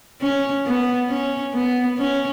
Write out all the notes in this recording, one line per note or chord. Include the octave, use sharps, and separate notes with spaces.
C#4
B3
C#4
B3
C#4